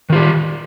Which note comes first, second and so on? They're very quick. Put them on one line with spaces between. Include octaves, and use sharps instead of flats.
D#3 F4 G4